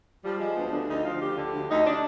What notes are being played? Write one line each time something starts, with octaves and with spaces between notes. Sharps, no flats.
F3 G3
F3 G#3
D2 B3
D3 D4
D2 D#4
F3 F4
D2 G4
D3
D2
D2 D#4
D4